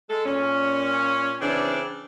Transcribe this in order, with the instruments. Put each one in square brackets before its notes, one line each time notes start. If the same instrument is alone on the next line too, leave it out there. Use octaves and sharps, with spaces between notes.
[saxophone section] G#3 A4
A#2 C#4
C#3 E3 C4 D4